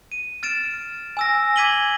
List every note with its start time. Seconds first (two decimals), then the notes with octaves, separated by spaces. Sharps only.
0.12 D#7
0.43 F6 A6 D7 E7
1.17 G#5 E6 A#6
1.56 D6 G#6 B6 D#7 F#7 G7